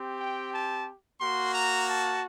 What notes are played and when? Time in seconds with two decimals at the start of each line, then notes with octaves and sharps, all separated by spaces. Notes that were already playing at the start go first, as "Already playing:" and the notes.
Already playing: C4 G4
0.18 G5
0.53 A5
1.19 A#3 F#4 C6
1.54 A#5
1.87 A5